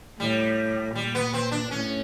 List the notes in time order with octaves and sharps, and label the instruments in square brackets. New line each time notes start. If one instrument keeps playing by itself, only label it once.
[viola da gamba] A2 [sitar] G3
[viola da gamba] A#2 [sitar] G3
[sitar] B3
C4
D4
[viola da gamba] A2 [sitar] C#4